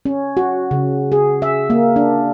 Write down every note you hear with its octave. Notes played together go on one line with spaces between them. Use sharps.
C#4
F#4
C#3
G#4
E5
A#3
D4